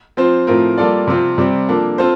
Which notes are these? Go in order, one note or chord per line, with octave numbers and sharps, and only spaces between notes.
F3 C4 F4 C5
A2 F3 C4 F4 A#4
G3 A#3 F4 A4 D5
C3 F3 C4 F4
C3 G3 C4
F3 A#3 D4 A4
C4 F4 A4 C5